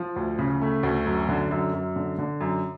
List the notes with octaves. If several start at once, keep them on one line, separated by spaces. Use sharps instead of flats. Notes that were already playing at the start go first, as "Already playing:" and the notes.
Already playing: F3
D2
C#3
A3
D2
F#2
D3
F#2
F#2
D3
D3
F#2